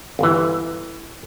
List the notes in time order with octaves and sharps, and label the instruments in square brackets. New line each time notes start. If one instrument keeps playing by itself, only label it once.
[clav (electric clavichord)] G1 E3